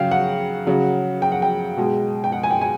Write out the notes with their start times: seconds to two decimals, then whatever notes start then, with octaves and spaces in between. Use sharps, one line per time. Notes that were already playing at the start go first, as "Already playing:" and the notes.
Already playing: C#3 F#3 F5 G5
0.11 F#5
0.67 C#3 F#3
1.22 G5
1.32 F#5
1.42 G5
1.77 B2 G#3
2.24 G5
2.32 F#5
2.43 G#5
2.51 G5
2.61 G#5